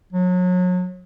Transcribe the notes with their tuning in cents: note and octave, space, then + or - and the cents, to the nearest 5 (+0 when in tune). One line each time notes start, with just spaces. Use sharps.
F#3 -35